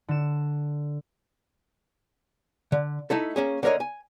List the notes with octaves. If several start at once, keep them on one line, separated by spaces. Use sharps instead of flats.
D3 E7
D3
A3 D#4 E4 A4
A#3 C#4 G#4
D3 A#3 A#4 C#5 D#5
G#5